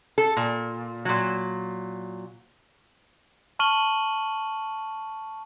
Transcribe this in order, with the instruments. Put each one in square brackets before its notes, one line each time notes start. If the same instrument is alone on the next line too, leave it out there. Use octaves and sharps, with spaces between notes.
[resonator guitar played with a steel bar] A4
A#2
A#2 F#3
[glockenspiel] A5 C#6 F6 D#7 F#7 G7